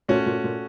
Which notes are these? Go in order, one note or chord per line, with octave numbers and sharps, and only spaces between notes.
A#2 A3 C#4 F#4
A#2
A#2